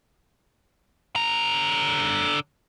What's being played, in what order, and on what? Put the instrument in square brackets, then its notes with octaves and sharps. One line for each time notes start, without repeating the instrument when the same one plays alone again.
[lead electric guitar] D3 A#5